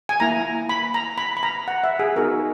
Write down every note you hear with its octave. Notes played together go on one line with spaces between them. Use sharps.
G#5
A#3 E4 A#5
B5
A#5
B5
B5
A#5
F#5
E5
G#4
B3 D#4 F#4 A#4